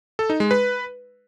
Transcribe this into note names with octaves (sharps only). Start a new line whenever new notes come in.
A4
D#4
G#3
B4